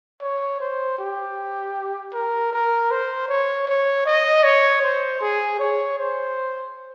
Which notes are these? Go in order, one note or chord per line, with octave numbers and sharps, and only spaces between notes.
C#5
C5
G4
A#4
A#4
C5
C#5
C#5
D#5
C#5
C5
G#4
C#5
C5